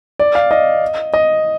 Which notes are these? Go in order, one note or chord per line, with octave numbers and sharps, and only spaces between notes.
D5
F5
D#5
D#5